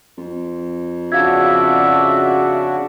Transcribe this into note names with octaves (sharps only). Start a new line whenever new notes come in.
F2
C#3 D4 F#4 E5 F5 G#6